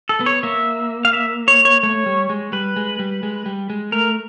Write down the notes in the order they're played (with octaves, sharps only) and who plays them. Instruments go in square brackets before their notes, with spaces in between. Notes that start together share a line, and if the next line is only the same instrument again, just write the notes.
[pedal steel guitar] A4
[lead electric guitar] B3
[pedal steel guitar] C#5
[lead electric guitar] A#3 [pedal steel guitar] E5
[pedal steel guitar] F5
E5
C#5
C#5
[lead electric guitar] A3 [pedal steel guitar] C#5
[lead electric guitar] G3
G#3
[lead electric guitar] G3 [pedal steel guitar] B4
[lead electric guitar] G#3
G3
G#3
G3
G#3
[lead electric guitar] A3 [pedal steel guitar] A#4